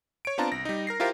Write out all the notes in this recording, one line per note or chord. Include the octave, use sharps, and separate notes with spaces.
C#5 D7
B3 C4 D4 F4 A5 A#5
C2 A#6
G3 D#4
A#4 A#6 C7
E4 F4 G4 A#4 C5 F5